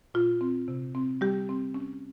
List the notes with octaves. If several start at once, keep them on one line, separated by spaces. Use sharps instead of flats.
A#2 F4
C4
C3
C4
G3 G4
C4
C#4